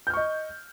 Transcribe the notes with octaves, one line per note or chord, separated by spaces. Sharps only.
D#5 C#6 F6 G6